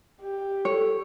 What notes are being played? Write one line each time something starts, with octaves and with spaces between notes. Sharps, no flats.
G4
A4 C#5